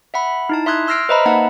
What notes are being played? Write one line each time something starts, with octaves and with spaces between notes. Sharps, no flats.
E5 F#5 B5
D#4 E4 A5
E5 C6 D#6 F#6 G#6
C6 E6 F6 A#6 C7 D7
B4 C5 D#5 E5 A#5 B5
A#3 D#4 E5 F#5 A5